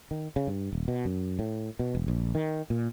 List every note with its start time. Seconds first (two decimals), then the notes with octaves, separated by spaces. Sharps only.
0.11 D#3
0.36 C#3
0.47 G2
0.73 D#1
0.88 B2
1.05 F#2
1.39 A2
1.79 B2
1.95 E1
2.08 A#1
2.35 D#3
2.70 A#2